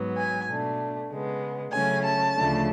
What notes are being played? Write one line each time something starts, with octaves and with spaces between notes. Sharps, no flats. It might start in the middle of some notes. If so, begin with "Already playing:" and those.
Already playing: G#2 F#3 B3
G#5
B2 A3 D4
C#3 G#3 B3
C#3 F#3 A3 C#4 G#5
A5
D2 C#3 F3 A3 D4